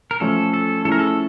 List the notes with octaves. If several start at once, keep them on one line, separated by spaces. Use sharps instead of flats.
A#4
F3 A3 C#4 A4
A4
F3 A3 C#4 E4 G#4 A4
A#4
A4